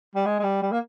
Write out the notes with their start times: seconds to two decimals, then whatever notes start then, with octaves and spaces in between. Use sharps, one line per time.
0.15 G3
0.26 G#3
0.39 G#3
0.43 G3
0.62 G3
0.72 A#3